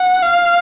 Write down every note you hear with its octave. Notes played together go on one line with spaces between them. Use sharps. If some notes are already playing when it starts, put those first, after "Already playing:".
Already playing: F#5
F5